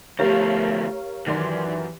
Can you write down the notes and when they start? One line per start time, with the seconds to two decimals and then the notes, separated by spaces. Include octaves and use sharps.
0.19 D2 F3 A3 G4 A#4 C#5 F5
1.27 F#2 D#3 E3 D5 C6